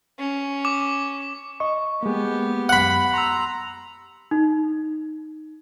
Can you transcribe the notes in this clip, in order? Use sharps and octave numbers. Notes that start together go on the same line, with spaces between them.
C#4
D6
D#5 C#6
G#3 A#3 B3 G4
F#2 F#5 B5 F#6
A#5 C6 E6
D#4